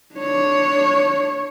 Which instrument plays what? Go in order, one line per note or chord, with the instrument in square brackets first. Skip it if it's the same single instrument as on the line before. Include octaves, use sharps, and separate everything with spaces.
[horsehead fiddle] D4 C#5